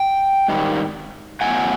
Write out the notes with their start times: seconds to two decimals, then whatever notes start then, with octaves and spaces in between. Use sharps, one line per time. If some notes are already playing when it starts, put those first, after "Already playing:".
Already playing: G5
0.48 G#2 D#3 G3
1.41 A2 F#3 B3 F#5 G#5